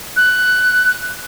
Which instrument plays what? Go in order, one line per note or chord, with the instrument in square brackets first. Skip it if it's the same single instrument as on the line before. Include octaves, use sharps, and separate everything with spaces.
[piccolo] F#6